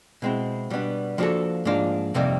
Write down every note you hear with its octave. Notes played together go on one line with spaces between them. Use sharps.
B2 G#3 C4 E4
B2 G3 B3 D4
F3 A#3 D4 F#4 A4
G#2 F3 A#3 D4 F4
F2 C3 D#3 G3 A#3